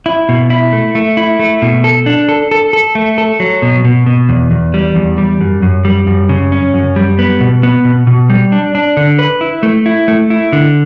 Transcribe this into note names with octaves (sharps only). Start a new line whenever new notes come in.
E4
B2
E4
A3
A3
E4
A3
B2
A4
D4
A4
A4
A4
A3
A4
F#3
B2
B2
B2
E2
E2
G3
E2
G3
F#2
F#2
G3
F#2
C#3
C#4
F#2
G3
B3
B2
B3
B2
B2
G3
D4
D4
D3
B4
E4
A3
E4
A3
E4
D3